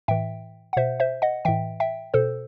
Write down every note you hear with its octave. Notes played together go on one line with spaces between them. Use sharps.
A2 E3 E5 G5
F#5
B2 C5 E5
C5 E5
D#5 F#5
A2 E3 E5 G5
E5 G5
B2 A4 C5